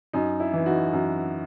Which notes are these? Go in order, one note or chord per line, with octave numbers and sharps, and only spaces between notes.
F#2 D#4
E4
E3
D#4 F#4
F#2